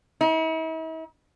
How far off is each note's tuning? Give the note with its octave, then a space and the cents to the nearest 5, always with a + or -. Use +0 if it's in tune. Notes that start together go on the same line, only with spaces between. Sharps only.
E4 -45